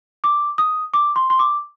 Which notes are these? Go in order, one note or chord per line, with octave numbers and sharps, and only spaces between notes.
D6
D#6
D6
C6
C6
D6